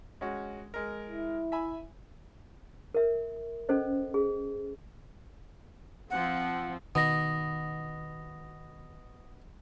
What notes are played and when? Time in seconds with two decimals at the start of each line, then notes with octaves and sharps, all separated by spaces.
0.21 G#3 C#4 F#4
0.74 G#3 A#4
1.09 E4
1.52 E5 G#5 B5
2.95 A#4 E5
3.69 C#4 A4 C5 D#5
4.14 G#4
6.10 F3 C4 F#5
6.95 B2 D#3 D#6 A#6